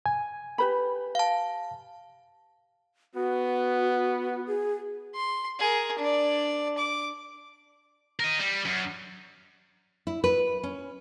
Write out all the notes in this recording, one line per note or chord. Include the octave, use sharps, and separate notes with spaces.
G#5
G4 B4 B5
F5 A5
B3 F#4
G#4
C6
G#4 A#4
D4 D5
D6
A#4 D#5
G3
F#2
E4
B4
C#4